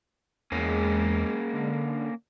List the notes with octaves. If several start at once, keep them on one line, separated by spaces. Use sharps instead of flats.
E2 G#3 A#3 C#4
D3